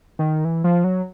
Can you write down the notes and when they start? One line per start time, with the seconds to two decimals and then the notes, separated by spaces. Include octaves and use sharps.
0.19 D#3
0.45 E3
0.64 F3
0.84 F#3